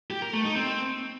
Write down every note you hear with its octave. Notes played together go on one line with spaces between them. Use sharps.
G4
A#4
A3
D#4
C4